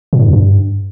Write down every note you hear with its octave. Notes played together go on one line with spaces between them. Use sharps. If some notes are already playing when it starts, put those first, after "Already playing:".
A#2
G#2
F2
G2